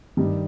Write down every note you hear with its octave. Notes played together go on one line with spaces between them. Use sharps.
G2 D#3 G3